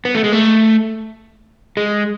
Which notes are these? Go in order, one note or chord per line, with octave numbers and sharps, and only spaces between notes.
B3
A3
G#3
A3
G#3